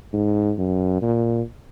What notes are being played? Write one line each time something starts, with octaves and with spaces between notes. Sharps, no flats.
G#2
F#2
A#2